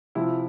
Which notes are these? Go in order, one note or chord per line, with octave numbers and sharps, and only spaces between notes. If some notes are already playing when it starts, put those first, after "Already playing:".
C3 F3 E4